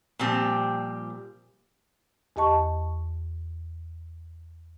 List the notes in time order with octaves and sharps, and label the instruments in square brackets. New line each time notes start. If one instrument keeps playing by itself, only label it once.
[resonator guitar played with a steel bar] A#2 F3 G3 C4 G4
[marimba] E2 G4 D#5 A5 C#6